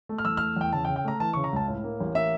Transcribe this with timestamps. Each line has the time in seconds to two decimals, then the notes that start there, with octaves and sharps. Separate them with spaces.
0.09 A3
0.18 F6
0.25 E2 E6
0.37 A3 F6
0.56 E2 G5
0.73 C#3 A5
0.85 G5
0.88 C#3
0.96 G5
1.05 A3 A#5
1.20 E3 A5
1.33 C#3 C#6
1.44 A#5
1.53 C#2 A5
1.68 A2
1.84 A#3
2.00 A1
2.15 A#3 E5